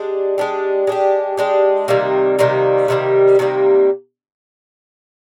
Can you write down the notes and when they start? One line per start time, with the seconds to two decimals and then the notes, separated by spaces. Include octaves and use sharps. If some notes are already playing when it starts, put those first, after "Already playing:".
Already playing: G#3 D4 G4
0.38 G#3 D4 G4
0.87 G#3 D4 G4
1.37 G#3 D4 G4
1.88 C3 D#3 G3 A#3
2.39 C3 D#3 G3 A#3
2.88 C3 D#3 G3 A#3
3.39 C3 D#3 G3 A#3